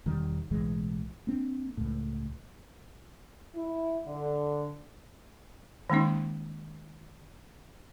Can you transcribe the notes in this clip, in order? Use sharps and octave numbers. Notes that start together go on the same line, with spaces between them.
E1 D#3 G3
B1 A2 E3 G#3
A#3 C4 D4
C#2 A2
E4
D3
D#3 G#3 A#3 C#4 D#4